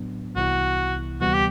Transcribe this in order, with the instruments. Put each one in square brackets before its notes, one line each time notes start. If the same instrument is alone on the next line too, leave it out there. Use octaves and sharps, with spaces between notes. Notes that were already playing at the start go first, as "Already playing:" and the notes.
Already playing: [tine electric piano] A2 F#3 B3 D4
[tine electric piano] C2 C3 E3 B3 E4 [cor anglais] F#4
[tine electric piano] D2 C3 E3 G3 B3 [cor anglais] F#4
[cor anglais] G4